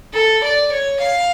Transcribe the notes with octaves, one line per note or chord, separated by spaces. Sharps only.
A4
D5
C#5
F5